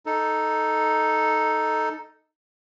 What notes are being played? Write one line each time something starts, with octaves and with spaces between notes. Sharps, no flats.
D#4 A4